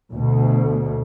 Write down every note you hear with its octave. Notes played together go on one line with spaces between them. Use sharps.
D2 B2